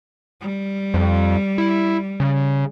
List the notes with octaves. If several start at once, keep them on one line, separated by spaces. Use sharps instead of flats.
G3
F2
E4
C#3